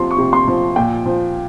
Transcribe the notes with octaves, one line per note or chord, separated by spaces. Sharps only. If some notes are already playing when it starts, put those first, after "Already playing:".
Already playing: C3 F3 C6
C#6
C3
C6
F3
A#2 G5
F3